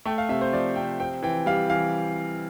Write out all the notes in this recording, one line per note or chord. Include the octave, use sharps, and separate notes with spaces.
A3 G5
F5
C3 E5
C5
F3 D5
C3 G5
C4 G5
E3 G5
G3 F5
E3 F5